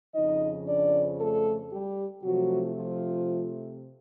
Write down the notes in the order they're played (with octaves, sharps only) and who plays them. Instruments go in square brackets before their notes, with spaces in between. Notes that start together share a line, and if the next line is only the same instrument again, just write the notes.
[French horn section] F2 C#3 F3 D#4 D#5
D4 D5
A3 A4
G3 G4
C3 F3 F#3 A3 F#4
F3 F4